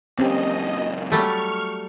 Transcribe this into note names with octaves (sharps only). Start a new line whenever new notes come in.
C#2 F#2 C4 C#4 G4 D#5
F#3 G3 A3 C#6 F6